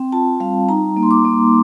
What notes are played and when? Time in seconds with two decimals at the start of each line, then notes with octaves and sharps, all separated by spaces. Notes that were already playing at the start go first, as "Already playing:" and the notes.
Already playing: C4 G5
0.12 F4 A5
0.40 G3 F5
0.69 D#4 A#5
0.97 A#3
1.03 C6
1.11 D6
1.25 A#3